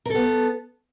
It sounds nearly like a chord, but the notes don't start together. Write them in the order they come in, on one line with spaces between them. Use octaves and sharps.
A#4 A4 B3